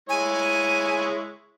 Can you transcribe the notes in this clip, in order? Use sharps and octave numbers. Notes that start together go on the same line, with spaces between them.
G#3 E4 C#5 G#5